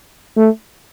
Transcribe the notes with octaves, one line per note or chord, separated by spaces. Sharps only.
A3